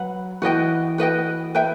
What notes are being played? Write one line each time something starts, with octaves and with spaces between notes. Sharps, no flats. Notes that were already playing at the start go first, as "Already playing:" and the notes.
Already playing: F#3 B4 F#5 B5
E3 F#4 B4 D#5 G5
F#4 B4 D#5 G5
B4 E5 G5